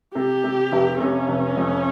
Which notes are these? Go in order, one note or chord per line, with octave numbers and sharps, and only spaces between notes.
C3 G4
C3
F1
C3 C#4
F1
F2